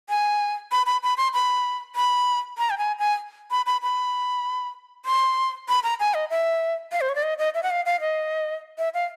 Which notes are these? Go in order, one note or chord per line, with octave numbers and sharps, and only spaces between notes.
G#5
B5
B5
B5
C6
B5
B5
A#5
G5
G#5
G#5
B5
B5
B5
C6
B5
A#5
G#5
D#5
E5
F5
C5
C#5
D5
D#5
D#5
E5
F#5
F5
F5
D#5
E5
F5